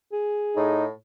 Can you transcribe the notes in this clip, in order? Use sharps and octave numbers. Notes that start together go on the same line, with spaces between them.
G#4
A2 D#4